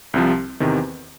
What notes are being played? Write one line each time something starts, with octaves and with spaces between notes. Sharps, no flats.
C2 C3 F3
E2 C3 D#3